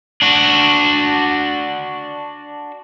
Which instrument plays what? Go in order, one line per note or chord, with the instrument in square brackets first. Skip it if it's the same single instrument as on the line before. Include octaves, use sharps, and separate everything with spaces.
[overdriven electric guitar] D4 F#4